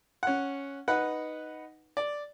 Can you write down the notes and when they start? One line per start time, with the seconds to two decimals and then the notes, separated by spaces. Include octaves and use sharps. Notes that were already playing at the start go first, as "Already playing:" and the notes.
0.23 C#4 F#5
0.88 D#4 B4 F#5
1.97 D5